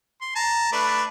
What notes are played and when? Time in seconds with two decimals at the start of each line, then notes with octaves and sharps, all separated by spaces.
0.21 C6
0.35 A5 A#5
0.72 A3 D4 B4